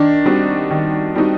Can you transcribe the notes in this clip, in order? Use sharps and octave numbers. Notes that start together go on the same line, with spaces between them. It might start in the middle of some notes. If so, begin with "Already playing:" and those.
Already playing: D#3 D4
G3 C4 D#4 F#4
D#3
G3 C4 D#4 F#4